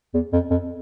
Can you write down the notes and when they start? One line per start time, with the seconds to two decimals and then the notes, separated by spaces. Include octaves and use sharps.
0.14 E2
0.33 F2
0.50 F2